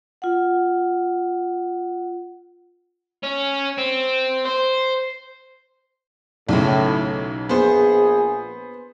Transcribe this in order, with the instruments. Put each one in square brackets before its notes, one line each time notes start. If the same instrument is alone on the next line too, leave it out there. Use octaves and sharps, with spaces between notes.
[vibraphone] F4 F#5
[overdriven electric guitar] C#4
C4
C5
[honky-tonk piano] B1 C#3 [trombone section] A2
[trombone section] A#1 G#4 [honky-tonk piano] B3 C5